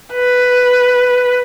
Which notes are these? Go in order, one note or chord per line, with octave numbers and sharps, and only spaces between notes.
B4